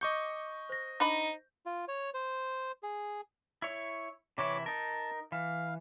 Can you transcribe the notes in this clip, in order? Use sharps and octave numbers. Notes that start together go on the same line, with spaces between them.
D#5 C#6 D6 G6 C#7
C5 A#6
D4 D#4 B5
F4
C#5
C5
G#4
E4 C#5
C3 E3 E4 C#5 D6
D#4 A#4 A5
E3 F5